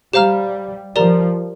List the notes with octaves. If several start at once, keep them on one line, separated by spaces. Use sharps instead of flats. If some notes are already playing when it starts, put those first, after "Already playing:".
G3 G4 C5 F5 A#5 F6
F3 G4 A#4 D5 A#5